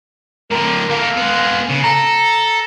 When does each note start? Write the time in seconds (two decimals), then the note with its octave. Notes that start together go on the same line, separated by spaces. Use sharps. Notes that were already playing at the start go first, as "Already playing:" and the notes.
0.51 A2 D3 A#4
0.90 A#3 A4 F5
1.17 G#3 B3
1.69 C#3
1.84 A4 A#5